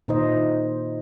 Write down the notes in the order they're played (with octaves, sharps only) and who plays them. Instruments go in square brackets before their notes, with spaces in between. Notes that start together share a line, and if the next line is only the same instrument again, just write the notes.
[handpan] A#2 D#3 D#4 E4 C5 D#5